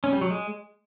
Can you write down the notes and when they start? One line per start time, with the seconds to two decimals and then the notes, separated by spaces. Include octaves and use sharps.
0.04 C#4
0.13 G3
0.21 F#3
0.30 G#3